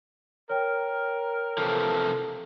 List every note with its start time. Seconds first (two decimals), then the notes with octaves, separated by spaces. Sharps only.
0.50 A#4 C#5 G5
1.58 C3 E3 F3 A4